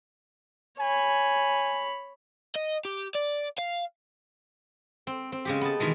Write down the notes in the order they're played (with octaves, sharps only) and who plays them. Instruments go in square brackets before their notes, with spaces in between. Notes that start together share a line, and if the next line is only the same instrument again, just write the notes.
[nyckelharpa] C#5 B5 [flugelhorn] G#5
[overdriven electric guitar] D#5
G4
D5
F5
[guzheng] C4
C4
C#3 G#3 G4
B3 A5
B2 D#3 E3 G#3